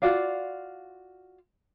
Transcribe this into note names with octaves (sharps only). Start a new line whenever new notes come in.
F4 F#4 D5 F5